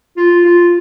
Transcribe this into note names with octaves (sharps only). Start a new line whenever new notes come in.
F4
F4